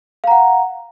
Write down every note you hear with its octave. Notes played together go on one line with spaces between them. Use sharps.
F5 F#5 A#5